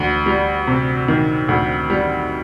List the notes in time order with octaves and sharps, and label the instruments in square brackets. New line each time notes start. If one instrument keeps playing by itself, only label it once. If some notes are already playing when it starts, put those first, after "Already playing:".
Already playing: [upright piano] D2
G3
C3
D#3
D2
G3